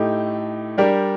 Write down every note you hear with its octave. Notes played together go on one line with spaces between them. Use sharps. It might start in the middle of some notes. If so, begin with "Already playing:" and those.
Already playing: A2 A3 D#4 G4
G3 D4 G4 A#4